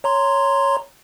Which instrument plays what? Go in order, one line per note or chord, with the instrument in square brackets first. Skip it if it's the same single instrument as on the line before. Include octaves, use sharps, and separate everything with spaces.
[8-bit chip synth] C#5 A#5 C6